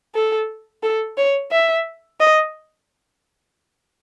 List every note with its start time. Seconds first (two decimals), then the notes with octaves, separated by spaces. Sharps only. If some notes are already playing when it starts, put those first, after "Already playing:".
0.15 A4
0.83 A4
1.17 C#5
1.51 E5
2.20 D#5